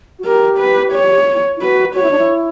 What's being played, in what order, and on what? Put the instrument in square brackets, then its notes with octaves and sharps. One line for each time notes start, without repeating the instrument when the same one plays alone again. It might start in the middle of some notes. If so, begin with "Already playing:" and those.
[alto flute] F#4
[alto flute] G4 [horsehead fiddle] A#4
[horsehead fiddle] B4
C#5
[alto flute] E4
[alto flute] F#4 [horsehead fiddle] B4
[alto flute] F#4 [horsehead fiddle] C#5
[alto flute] E4
D4
E4